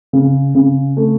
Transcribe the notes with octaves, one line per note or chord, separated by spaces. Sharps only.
C#3
C#3
A3